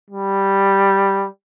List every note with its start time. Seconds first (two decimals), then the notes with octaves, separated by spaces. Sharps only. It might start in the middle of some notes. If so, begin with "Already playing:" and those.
0.10 G3